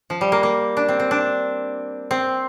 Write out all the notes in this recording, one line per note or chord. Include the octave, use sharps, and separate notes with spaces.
F3
G3
A#3
A#3
D4
C4
C4
D4
C4